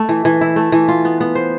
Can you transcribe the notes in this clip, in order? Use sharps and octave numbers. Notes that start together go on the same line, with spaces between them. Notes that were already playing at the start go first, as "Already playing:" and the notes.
Already playing: A3
E3
E3
E4
A3
E3
F4
B3
B3
C5